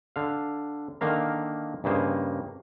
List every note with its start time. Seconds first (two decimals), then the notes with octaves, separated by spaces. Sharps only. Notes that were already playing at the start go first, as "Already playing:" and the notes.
0.16 D3 F5
1.01 D3 D#3 A#3 F5 A#5
1.84 G2 C#3 A#3 C5 D#5 G#5